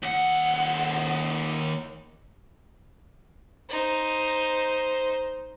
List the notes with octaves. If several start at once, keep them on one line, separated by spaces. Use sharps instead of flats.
D#2 F#5
D#4 C5